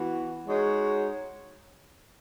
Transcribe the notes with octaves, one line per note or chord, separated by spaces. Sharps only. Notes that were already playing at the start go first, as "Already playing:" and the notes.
Already playing: E3 B3 F#4
G#3 D#4 F#4 C#5